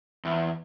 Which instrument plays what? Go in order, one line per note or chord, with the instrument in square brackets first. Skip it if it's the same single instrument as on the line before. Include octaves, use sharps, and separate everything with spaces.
[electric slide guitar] E2